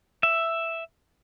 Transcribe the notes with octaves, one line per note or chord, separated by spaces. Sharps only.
E5